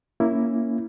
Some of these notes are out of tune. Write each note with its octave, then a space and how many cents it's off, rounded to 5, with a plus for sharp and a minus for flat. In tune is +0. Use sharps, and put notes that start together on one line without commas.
A#3 +0 C#4 +0 E4 +0